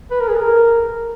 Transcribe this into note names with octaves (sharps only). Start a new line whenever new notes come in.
B4
A#4
G#4
A#4